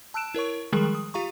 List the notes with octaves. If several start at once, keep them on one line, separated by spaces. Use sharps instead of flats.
A5 E6 F#6 D7 E7
E4 A#4 C#5 C#6
D#3 F3 G3 G#3 G#4 A#4
D#6
F4 G4 F5 A#5 C#6